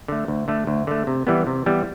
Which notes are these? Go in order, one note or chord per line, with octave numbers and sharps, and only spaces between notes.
D3 A3
D2
D3 A3
D2
D3 A3
C3
E3 G3 B3
C3
E3 G3 B3